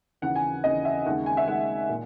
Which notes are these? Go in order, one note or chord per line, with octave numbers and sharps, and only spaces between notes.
D#2 C#3 E3 F#5
G#5
D#2 C#3 E3 D#5
E5
D#2 C#3 G#3 F#5
G#5
E5
D#2 C#3 G#3 F#5
A#2